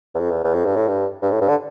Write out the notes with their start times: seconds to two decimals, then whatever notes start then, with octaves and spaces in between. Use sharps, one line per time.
0.15 E2
0.20 F2
0.31 E2
0.44 E2
0.54 F2
0.65 G2
0.76 A2
0.88 G2
1.22 G2
1.32 A2
1.41 G2
1.49 D3